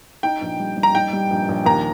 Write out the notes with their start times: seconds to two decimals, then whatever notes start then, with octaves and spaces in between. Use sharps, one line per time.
0.23 D#4 G5
0.41 A#1
0.60 G3
0.77 G3
0.83 A#5
0.95 D#4 G5
1.13 G3
1.30 A#1
1.48 A#1
1.66 D#2 A#5